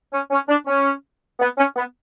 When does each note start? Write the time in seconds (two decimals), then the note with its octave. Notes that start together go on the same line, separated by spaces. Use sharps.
0.13 C#4
0.31 C#4
0.49 D4
0.67 C#4
1.40 B3
1.58 C#4
1.76 B3